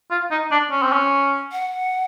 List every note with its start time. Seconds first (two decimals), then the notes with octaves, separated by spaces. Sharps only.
0.11 F4
0.31 D#4
0.52 D4
0.71 C#4
0.83 C4
0.93 C#4
1.52 F#5